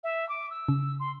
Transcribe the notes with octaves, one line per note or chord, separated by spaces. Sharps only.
E5
D6
E6
C#3
C6